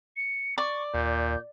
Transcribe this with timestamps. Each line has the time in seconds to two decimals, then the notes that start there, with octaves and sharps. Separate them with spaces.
0.17 C#7
0.58 D5 C#6
0.94 D#2 A#2 G6